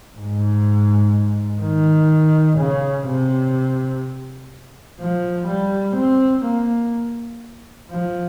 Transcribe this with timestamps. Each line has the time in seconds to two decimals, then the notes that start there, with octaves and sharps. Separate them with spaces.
0.18 G#2
1.62 D#3
2.59 C#3
3.08 C3
5.00 F3
5.48 G3
5.97 C4
6.46 A#3
7.90 F3